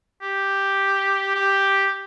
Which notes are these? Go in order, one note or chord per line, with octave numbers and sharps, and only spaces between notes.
G4
G4